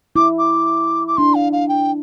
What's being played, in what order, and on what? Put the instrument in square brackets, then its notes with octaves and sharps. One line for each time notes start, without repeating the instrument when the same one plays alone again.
[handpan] E4 [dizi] D6
[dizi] D6
D6
[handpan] D4 [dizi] C6
[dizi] F5
F5
G5